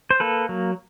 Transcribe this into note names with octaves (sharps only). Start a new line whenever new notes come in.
C5
A#3 A4 B4
F#3